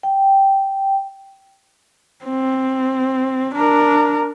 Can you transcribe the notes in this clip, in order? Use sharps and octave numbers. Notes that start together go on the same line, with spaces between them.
G5
C4
D4 A#4